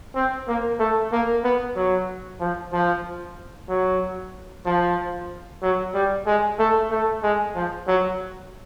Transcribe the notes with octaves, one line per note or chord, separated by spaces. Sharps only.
C4
A#3
A3
A#3
B3
F#3
F3
F3
F#3
F3
F#3
G3
G#3
A3
A3
G#3
F3
F#3